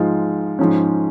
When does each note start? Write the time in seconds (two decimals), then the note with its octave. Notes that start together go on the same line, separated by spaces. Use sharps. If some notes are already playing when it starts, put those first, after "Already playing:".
Already playing: G#2 F3 G#3 F4
0.59 G#2 F3 C#4